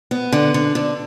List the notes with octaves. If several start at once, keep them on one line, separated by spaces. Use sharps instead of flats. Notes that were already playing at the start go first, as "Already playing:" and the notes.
B3
D3
D3
D3